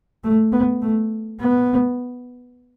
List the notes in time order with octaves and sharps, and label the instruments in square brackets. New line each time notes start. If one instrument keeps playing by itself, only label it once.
[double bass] A3
B3
A3
B3